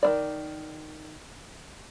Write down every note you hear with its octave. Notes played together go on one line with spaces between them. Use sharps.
D#3 A#3 D5